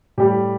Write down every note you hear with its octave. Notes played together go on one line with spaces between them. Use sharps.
A2 G3 G4